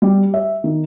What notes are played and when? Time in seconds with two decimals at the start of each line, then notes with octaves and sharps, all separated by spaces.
0.02 G3
0.34 E5
0.64 D#3